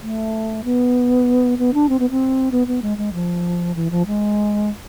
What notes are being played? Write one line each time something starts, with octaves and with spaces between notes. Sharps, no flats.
A3
B3
B3
D4
C4
B3
C4
B3
B3
G#3
G#3
F3
E3
F3
G#3